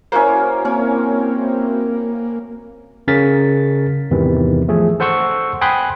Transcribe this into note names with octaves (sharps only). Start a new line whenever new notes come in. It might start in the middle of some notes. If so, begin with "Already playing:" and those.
A#3 C#4 E4 F#4 C5
A#3 C4 C#4
C#3 C#4 A#4 A6 B6
E2 G#2 C3 D#3 E3
F3 A3 G#4
A4 C5 F#5 C6 C#6 E6
G5 G#5 B5 C6 D#6 F#6